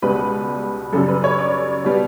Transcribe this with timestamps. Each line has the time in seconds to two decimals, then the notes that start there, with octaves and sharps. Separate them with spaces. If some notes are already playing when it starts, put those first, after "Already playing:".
0.02 C#2 B2 G3 B4
0.93 F#2 C#3 G3 A4
1.08 B4
1.24 C#5
1.39 D5
1.84 B2 G3 B3